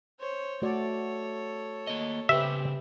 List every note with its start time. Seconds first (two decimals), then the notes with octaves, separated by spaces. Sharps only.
0.20 C5 C#5
0.62 A3 F#4 A4 C#5 D5
1.87 A#3 D#5
2.29 C#3 G4 B4 C5 E5